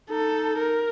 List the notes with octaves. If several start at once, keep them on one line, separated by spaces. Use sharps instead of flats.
D#4 A4
A#4